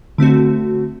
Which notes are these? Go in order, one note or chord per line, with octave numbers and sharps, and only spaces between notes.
D3 A3 C4 F#4